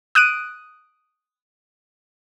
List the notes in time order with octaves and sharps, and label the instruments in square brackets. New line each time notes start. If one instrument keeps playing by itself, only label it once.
[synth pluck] D#6 F#6 D7 D#7